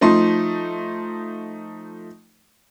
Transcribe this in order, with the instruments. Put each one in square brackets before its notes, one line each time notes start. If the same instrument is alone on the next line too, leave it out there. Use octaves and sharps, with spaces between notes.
[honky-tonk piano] F3 A3 D#4 C6